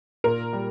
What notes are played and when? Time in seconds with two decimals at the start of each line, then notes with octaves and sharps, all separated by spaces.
0.24 A#2 A#4
0.53 G3